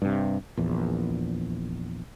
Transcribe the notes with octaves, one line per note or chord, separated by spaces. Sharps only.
G2 C3
A#1 E2